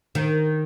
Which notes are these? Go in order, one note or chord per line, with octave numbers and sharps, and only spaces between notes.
D#3